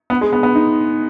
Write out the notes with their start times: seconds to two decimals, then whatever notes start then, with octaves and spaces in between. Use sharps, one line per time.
0.10 B3
0.21 G#3
0.33 B3
0.43 B3
0.55 D#4